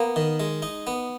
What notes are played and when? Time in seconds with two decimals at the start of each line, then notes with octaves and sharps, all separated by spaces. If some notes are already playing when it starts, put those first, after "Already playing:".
Already playing: A#3 B3
0.16 D#3
0.40 G#3
0.62 D#4
0.87 B3